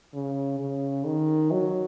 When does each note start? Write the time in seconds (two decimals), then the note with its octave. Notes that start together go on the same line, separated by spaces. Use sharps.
0.14 C#3
0.59 C#3
1.06 D#3
1.51 F#3